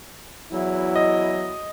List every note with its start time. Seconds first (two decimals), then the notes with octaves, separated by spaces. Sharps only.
0.52 E2 F#3 E4
0.96 D#5